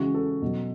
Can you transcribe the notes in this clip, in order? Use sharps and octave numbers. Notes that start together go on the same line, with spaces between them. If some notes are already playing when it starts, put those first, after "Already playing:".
Already playing: C#3 E3 G#3 F#4
A4
B2 F#3